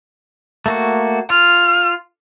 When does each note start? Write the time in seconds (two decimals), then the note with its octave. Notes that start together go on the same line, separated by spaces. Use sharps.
0.66 A3 A#3 F#4
1.30 F4 F6